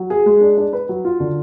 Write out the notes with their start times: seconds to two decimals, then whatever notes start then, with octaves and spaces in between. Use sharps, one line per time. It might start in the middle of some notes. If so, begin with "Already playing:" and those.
Already playing: F#3
0.10 G#4
0.26 G#3
0.41 D4
0.58 D4
0.73 B4
0.89 F#3
1.05 F4
1.20 D3